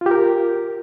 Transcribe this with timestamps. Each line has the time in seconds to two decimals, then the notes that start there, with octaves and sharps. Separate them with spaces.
0.01 F4
0.06 G4
0.11 A#4